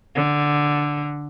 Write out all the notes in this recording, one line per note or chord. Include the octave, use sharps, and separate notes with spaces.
D3